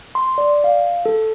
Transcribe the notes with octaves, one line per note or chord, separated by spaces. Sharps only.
C6
D5
F5
A4